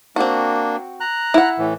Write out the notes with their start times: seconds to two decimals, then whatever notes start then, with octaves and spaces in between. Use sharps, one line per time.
0.16 A#3 C4 D4 F#4
1.00 A#5 F#6
1.34 E4 F#5
1.58 A2 E3